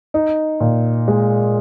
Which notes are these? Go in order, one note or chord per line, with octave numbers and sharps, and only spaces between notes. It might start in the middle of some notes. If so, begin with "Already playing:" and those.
D#4
A#2
G#3